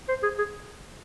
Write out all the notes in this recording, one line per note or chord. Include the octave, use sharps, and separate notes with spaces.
C5
G#4
G#4